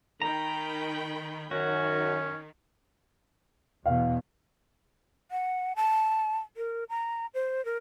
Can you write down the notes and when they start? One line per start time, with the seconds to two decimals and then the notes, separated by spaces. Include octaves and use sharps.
0.22 D#3 G5 A#5 B5
1.51 F#2 D#3 C#4 F#4
3.86 E2 B2 F5
5.31 F#5
5.76 A5
6.57 A#4
6.89 A#5
7.34 C5
7.65 A#4